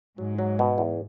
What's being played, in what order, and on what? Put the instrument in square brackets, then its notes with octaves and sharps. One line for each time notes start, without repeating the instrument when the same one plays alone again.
[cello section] G#2 [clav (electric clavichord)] F#3
[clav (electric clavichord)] F#3
B2
E2